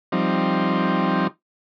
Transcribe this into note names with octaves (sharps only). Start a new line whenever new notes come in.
F3 G3 C4 D#4